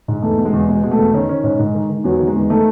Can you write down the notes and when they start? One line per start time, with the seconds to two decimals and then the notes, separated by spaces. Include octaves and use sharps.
0.08 G#2
0.22 E2 A3
0.37 B2
0.45 G#3
0.53 E2
0.68 B2 G#3
0.83 B2 G#3
0.91 A3
0.98 E2
1.13 D#3 C#4
1.29 D#3 C#4
1.44 G#2 C#4
1.59 G#2 G#3
1.74 D#3
1.89 D#3
2.04 E2 F#3
2.19 D#3
2.28 G#3
2.36 E2
2.50 D#3 A3